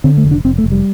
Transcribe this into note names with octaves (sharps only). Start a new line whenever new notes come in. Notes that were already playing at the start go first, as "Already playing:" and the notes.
D3 C4
A3
F1
D4
F1 C4
A3
F1
G3